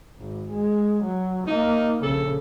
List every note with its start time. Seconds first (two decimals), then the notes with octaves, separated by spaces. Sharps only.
0.18 G#1
0.50 G#3
1.03 F#3
1.47 A#3 D#4
2.03 A#1 C#3 A4